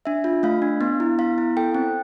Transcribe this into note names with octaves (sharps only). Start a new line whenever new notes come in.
D4 E5
F4
A3 F5
D4
B3
E4
B3 F5
E4
A4 G5
C4